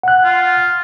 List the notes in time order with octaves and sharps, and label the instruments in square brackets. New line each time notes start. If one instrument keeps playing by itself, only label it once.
[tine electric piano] F#5 F#6
[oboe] F4